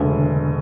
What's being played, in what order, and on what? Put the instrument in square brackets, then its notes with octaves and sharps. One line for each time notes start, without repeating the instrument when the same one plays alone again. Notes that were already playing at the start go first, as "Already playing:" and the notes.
Already playing: [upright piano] E1 D2 C#3